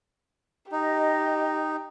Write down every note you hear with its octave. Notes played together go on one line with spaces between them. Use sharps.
D#4 G4 D#5